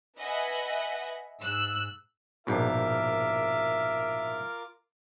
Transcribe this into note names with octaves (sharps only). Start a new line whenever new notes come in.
B4 D#5 E5 F#5 G#5
G#2 E6 F#6
A#1 G#2 B2 F4 A#4 E5 D6